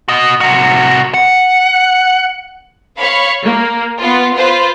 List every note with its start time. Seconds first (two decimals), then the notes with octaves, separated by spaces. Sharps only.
0.08 F#4 D#5
0.41 C3 F#4
1.14 F#5
2.99 C#5 F5 B5
3.41 A#3
3.98 B3 F4
4.34 F4 B4 C5